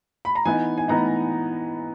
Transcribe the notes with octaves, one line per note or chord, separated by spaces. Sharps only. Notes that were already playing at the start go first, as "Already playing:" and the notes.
B5
A#5
E3 B3 D#4 G#5
G#5
E3 B3 D#4 A#5